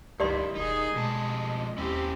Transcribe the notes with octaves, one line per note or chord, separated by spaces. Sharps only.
C#2 G2 D#3 E4 G4 D5 C6
E1 D#3 D#4 G#4
F2 B2 G3 G#3 A5
D#2 C4 C#4 E4 G4